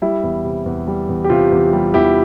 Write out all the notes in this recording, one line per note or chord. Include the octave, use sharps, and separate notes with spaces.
G3 E4
E2
C3
E2
G3
E2
G4
C3 F4
E2
G3
E2 E4 G4